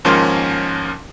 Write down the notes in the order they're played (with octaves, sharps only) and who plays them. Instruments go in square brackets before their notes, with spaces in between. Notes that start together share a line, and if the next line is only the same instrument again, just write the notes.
[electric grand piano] D#2 G#2 F3 C#4 A#4 C6